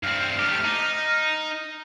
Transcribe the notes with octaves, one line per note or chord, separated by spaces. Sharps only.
G2 C4 F6
A3 G4
D#4